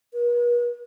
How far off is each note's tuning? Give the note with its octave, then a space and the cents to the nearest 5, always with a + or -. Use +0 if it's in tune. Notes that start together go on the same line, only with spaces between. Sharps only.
B4 -45